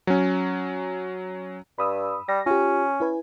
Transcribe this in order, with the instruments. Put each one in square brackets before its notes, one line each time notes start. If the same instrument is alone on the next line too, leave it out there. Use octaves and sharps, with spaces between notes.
[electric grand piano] F#3 C#4
[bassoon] G2 [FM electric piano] B5 D#6 E6
[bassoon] G3 [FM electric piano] A#6
[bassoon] C#4 [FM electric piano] F4 G4
[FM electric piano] E4 B4 G#5